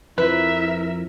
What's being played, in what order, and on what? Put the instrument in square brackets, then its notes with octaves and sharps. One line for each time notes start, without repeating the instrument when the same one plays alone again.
[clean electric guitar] F2 F3 [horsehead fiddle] E4 A#4 [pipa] B4 [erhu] E5